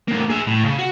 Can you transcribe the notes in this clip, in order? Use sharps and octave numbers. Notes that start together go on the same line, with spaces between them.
D2 A#3
G#4 E5
A2
C#3
F#4